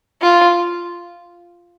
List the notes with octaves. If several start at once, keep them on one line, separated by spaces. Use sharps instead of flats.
F4